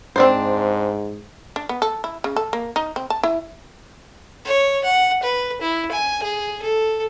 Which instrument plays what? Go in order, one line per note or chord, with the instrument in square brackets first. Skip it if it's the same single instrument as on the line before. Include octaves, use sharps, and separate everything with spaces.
[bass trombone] G#2 [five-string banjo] C4 D4 C5
[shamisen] D4
B3
A4
E4
C#3
A4
A#3
D#4
C4
A5
E4
[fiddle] C#5
F#5
B4
E4
G#5
G#4
A4